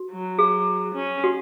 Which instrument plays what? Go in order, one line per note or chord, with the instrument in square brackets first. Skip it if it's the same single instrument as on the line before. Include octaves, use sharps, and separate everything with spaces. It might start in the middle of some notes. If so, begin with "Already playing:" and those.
Already playing: [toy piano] F#4
[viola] F#3
[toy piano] G#4
[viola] C#4
[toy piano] F#4